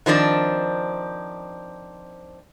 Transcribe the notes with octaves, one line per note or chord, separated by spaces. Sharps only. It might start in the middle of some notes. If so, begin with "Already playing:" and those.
D#3 F3 C4 D4